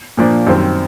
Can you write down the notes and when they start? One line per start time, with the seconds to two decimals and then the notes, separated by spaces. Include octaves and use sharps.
0.17 A#2 F3 A#3 D4
0.47 F#2 D#3 G3 C4